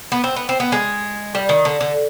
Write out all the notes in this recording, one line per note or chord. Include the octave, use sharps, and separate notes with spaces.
B3
C4
B3
C4
B3
G#3
G3
D#3
D3
D3